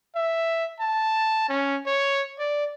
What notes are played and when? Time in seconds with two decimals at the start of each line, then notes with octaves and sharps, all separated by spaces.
0.15 E5
0.80 A5
1.49 C#4
1.87 C#5
2.39 D5